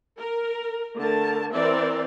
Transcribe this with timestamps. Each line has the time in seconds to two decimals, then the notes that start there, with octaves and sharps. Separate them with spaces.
0.18 A#4
0.96 D3 A3 A#4 A5
1.53 E3 C4 A#4 D5 E5